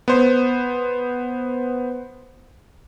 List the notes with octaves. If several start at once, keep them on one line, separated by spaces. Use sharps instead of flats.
B3 C5